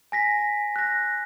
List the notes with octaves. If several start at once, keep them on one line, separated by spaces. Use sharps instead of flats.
G#5 A#6 B6
F#6 A#6